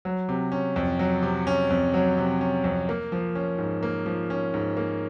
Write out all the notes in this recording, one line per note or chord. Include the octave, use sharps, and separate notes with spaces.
F#3
C3
C#4
F2
F#3
C3
C#4
F2
F#3
C3
C#4
F2
A#3
F3
C#4
G#2
A#3
F3
C#4
G#2
A#3